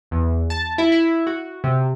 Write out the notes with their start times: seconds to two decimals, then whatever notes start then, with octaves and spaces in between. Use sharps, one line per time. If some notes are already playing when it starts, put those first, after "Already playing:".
0.11 E2
0.50 A5
0.78 E4
0.92 E4
1.27 F#4
1.64 C3